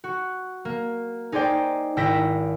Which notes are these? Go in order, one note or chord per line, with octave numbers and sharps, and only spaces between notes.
F#4
A#3
D#4 G#4 C5 D5 G5
G#1 E4 G5 A#6 B6 E7